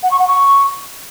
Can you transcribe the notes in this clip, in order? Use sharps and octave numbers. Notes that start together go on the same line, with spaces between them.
F#5
C#6
F#5
C#6